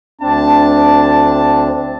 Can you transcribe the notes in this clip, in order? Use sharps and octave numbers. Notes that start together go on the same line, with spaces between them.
D2 C4 D4 A5